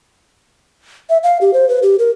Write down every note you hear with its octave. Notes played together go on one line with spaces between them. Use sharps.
E5
F5
G4
C5
B4
G4
A#4